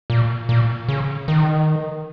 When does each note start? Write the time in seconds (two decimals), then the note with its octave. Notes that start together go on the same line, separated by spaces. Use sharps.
0.10 A#2
0.49 A#2
0.89 C#3
1.28 D#3